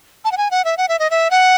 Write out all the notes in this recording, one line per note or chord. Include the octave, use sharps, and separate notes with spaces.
A5
F#5
G#5
F#5
E5
F#5
E5
D#5
E5
F#5